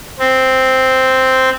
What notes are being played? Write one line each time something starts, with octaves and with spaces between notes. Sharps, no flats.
C4